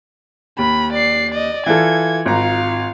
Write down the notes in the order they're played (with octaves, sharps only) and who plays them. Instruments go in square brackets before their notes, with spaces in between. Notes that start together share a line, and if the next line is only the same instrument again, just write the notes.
[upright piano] D#2 [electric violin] B5
[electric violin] D5 C7
D5 D#5
[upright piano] E3 F4 A4 [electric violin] G#6
[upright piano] G#1 A#5 [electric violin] F4 F5